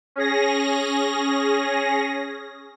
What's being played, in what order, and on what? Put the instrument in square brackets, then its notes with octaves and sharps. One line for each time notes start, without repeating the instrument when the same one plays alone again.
[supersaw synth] C#4 G#4 A#6